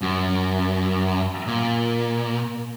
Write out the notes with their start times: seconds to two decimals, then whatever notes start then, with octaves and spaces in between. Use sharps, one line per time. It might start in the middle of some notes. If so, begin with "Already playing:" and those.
0.01 F#2
1.47 A#2